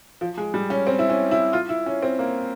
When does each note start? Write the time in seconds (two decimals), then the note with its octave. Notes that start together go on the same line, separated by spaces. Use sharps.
0.21 F3
0.37 G#3
0.54 G3
0.70 C#4
0.87 C4
0.99 E4
1.10 C#4
1.31 E4
1.53 F4
1.69 E4
1.86 C#4
2.02 C4
2.19 A#3